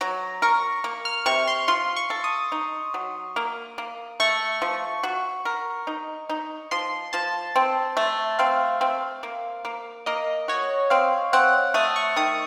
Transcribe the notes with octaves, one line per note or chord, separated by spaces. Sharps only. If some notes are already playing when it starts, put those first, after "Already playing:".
F#3 A#5
A#4 C#6
A#3
F6
C3 C#6
C6
F4 C6
C#6
A4
D#6
D#4
F#3
A#3
A#3
A3 C#6
F3
F#4
A#4
D#4
D#4
F3 C6
F3 A5
C4
A3
C4 F5
C4
A#3
A#3
A#3 D#5
F#4 C#5
C4 F5
C4 F#5
A3 D#6
C#6
D#3 D#6